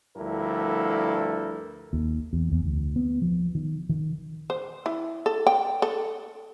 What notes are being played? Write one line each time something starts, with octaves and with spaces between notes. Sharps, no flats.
D2 G2 F3 E4 A4 A#4
D#2
E2
E2
D2
B3
F3
D#3
D#3
C5
E4
A4
G5
A4